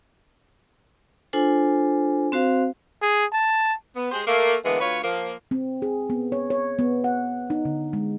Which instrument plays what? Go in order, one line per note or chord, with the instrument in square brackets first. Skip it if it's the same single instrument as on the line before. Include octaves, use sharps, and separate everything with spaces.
[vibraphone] D4 F4 A4 C5 G#5
C4 F#4 C5 F5
[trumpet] G#4
A5
[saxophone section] B3
G#3 G4 G#4 C5
A3 A#3
D3 E3 G#3 A#3 B3
D2 F4 B4 C#5
F3 A#3
[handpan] C4
G#4
B3
C#5
C#5
B3
F#5
D#4
D3
G#3